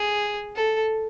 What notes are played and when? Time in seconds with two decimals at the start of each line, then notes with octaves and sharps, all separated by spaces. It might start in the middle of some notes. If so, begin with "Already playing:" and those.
Already playing: G#4
0.56 A4